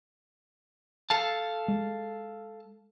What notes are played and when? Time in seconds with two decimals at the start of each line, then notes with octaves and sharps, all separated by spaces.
1.10 A4 F5 A5
1.68 G#3